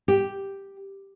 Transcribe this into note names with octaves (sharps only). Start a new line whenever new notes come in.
G4